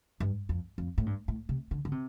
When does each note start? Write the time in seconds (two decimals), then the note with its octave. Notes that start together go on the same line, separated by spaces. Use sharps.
0.20 G2
0.49 F2
0.78 F2
0.98 A2
1.06 G2
1.28 A2
1.49 C3
1.71 D3
1.85 D3
1.92 C3